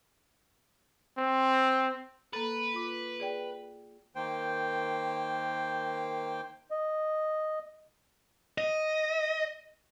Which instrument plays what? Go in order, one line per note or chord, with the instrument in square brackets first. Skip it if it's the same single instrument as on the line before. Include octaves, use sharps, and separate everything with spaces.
[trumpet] C4
[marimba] A#3 A4 [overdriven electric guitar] B4
[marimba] F4 D6
G#4 D5 G5
[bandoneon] D#3 A#3 C5 G5
[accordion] D#5
[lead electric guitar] D#5